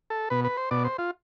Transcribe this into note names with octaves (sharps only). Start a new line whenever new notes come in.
A4
B2 B4
B4
C5
B2 D5
C5
F4